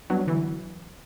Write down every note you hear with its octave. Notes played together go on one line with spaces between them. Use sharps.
F#3 G3 B3 D4 F#4
D3 E3